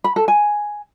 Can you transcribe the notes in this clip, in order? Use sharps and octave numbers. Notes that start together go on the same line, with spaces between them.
B5
A4
G#5